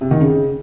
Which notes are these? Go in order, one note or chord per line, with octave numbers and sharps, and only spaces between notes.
C3
D#3
C#3